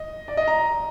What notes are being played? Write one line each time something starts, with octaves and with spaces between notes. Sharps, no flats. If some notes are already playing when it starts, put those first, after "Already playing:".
Already playing: D#5
D5
D#5
A#5